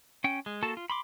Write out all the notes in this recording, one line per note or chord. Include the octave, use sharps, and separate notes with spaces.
C#4 G5
G#3
A#3 F#4 A4 A5
F4
B5 C6 D6